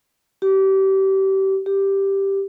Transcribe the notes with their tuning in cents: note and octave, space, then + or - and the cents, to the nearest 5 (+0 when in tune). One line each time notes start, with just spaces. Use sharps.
G4 -30
G4 +0